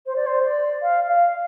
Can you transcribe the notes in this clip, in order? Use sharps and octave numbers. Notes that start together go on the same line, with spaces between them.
C5
D5
C5
D5
F5
F5